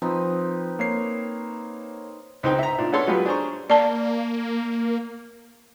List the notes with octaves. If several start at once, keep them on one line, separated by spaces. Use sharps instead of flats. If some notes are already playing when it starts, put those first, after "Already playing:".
F3 C4 D#4 B4
A#3 C#5 C7
C#2 C4 D#4 C5 G5
E5 A#5
A#2 D4 D#4
B3 C#4 D4 A4 C#5 C6
F#3 G#3 F4 G4 B4
D4 G#4 C5 A#5 C#6
A#3 D5 A5